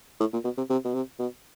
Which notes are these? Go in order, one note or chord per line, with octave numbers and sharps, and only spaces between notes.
A2
A#2
B2
C3
C3
B2
C3
B2